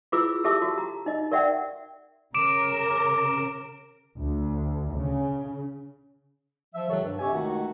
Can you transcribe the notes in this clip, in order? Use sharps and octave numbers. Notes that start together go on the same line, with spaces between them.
E4 F4 G#4 B4 D6 E6
G4 A4 E5 A5 D6 E6
F#4
A#5
D#4 D#5
A#4 D5 E5 F#5 G5
C#3 A#4 D6 D7 E7
D2
C#3
F3 E5
C#2 C3 D#3 F#3 A4 C#5
G2
F2 C3 G4 C#5 E5 G#5
C#2 D#3 A3 D#4 F#4